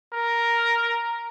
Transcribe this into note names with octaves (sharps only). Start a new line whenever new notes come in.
A#4